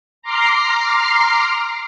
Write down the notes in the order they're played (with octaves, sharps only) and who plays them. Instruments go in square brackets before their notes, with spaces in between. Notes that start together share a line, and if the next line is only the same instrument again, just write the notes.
[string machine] A#5 C6 D6 F6 C7